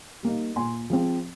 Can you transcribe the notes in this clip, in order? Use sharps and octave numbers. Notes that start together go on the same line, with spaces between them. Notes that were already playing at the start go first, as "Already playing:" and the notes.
G3 A#3 D#4
A#2 G#5 C6
F3 G#3 C4